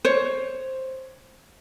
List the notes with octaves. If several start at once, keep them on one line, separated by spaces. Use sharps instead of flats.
C5 C#5